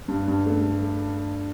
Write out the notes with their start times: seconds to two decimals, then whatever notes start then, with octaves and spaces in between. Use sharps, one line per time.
0.08 G2
0.28 G2
0.46 A3